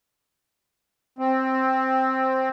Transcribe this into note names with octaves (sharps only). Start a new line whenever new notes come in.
C4